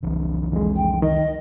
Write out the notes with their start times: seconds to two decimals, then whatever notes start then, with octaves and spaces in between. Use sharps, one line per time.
0.03 F1 C2 E3
0.53 F2 G#3
0.76 G5
1.02 D#3 D#5